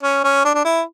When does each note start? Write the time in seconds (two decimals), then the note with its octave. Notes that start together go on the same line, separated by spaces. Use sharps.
0.03 C#4
0.24 C#4
0.45 D4
0.55 D4
0.65 E4